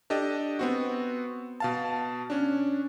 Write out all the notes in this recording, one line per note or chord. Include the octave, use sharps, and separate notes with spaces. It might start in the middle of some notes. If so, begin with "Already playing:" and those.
D4 G4 A4 D#5
B3 C4 F#4
B2 F5 A5
C#4 D4